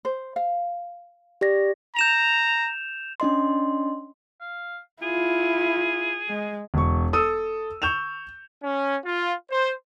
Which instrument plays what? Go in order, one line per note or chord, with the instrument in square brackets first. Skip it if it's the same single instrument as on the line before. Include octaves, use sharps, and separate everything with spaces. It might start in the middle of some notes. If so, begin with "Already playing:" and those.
[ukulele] C5
F5
[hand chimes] G4 D5 A#6
[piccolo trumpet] A#5 [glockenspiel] G6 E7 F7
[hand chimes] C#4 D4 D#5 C6
[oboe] F5
[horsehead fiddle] E4 F4 [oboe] G#4
[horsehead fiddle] G#3
[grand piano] E1 C#6
A4 D#6 E6 D#7
C#6 G6 E7 F7
[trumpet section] C#4
F4
C5